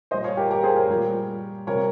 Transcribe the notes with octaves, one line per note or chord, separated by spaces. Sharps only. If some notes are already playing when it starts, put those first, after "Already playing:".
A#2 G3 C5 D#5
C#5 F5
G4 A#4
G4 A#4
G#4 C5
A#4 C#5
A#2 G3
C3 G3 A#4 C#5